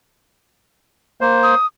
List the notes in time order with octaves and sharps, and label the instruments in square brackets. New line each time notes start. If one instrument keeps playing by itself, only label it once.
[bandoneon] A#3 C5
[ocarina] D#6